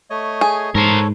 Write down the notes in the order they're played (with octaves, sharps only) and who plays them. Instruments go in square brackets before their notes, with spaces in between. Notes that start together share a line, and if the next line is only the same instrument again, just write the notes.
[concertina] A3 C#5 D#5
[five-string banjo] G#4
[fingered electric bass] G#2 [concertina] A4 C#5 [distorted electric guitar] A#4 C5